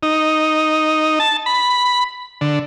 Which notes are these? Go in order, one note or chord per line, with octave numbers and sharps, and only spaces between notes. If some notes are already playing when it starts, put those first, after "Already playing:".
D#4
A5
B5
D3